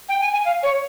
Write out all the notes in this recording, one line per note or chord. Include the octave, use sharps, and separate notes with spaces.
G5
G#5
G#5
F5
C#5